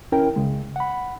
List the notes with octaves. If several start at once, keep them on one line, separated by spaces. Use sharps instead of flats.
D#2 C#4 E4 A#4 G5
C#2 C#3 G#3
F#5 B5